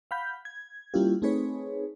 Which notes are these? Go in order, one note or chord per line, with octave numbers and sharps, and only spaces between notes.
F5 F#5 B5 G6
G#6
G3 A#3 C#4 E4 F4 G4
A3 C4 D#4 G#4 B4 C#5